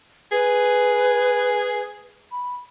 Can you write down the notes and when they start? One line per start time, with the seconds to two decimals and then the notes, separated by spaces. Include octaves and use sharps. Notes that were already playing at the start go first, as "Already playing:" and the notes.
0.32 G#4 B4
2.32 B5